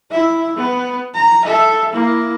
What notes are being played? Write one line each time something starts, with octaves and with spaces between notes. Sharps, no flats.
E4 E5
B3
A#5
A4 E5
A#3 E4